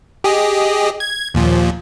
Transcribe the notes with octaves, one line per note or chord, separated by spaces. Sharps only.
G4 G#4 D#5
G#6
D#2 A#2 F3